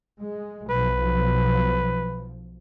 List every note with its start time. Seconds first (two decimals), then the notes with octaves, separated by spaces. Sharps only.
0.21 G#3
0.70 B1 F3 B4